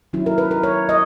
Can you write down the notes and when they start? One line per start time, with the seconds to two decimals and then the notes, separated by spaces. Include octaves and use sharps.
0.13 D#3 F#3 C#4 E4
0.26 A#4
0.38 B4
0.51 A#4
0.63 C#5
0.89 D#5